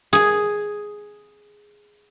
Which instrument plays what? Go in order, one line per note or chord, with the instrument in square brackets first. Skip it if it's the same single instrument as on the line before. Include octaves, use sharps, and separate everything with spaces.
[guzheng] G#4 G#5